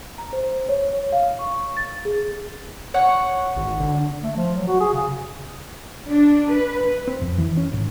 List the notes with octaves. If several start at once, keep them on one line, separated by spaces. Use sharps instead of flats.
A#5
C5
C#5
C#5
F5
C#6
A6
G#4
C#5 F#5
G#1
D3
A3
F3
F#3
F#4
G#4
C#3
D4
B4
C4
F2
E3
C#4
G#1